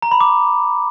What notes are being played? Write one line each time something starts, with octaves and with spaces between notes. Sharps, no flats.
A#5
B5
D6